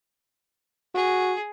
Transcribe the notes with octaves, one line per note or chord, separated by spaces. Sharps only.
F#4 G#4